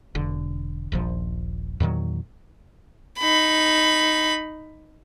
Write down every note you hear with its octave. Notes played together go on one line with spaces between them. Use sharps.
E1 D3
D#1 A#1 F3
E2 A#2 D#3 F#3
D#4 B5